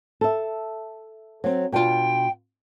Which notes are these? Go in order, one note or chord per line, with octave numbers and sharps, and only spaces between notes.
A4 E5
F#3 C4
B2 D4 F4 G5